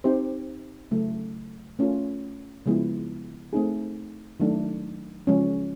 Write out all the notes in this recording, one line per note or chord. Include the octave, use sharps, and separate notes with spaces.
C4 D#4 G4 C5
C#3 F#3 A3
A3 C#4 F4
C#3 F3 G#3 B3 E4
A3 C4 D#4 G#4
D#3 F#3 A3 D4
C#3 F3 G#3 C#4